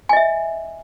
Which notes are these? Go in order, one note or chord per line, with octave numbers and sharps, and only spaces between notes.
D#5 E5 G#5